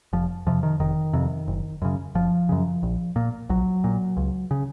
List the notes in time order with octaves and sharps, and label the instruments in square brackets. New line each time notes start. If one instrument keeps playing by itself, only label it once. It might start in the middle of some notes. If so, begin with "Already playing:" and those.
[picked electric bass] F1 F3
F2 C3 F3
D#3
F1 D#3
F2 C3
F#1
F#2 C#3
F#1 F3
F#2 C#3
A#1
A#2
A#1 F#3
A#2
C#2
C#3